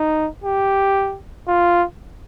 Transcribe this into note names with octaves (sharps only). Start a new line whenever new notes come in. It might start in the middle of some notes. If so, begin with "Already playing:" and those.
Already playing: D#4
G4
F4